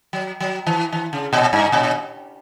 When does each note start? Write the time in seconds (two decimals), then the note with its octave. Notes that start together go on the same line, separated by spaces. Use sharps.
0.13 F#3
0.40 F#3
0.67 E3
0.92 E3
1.13 C#3
1.33 A#2
1.53 G2
1.72 A#2